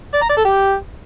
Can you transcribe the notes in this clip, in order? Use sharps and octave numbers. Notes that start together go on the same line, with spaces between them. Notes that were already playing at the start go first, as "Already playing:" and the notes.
D5
A#5
D5
A4
G4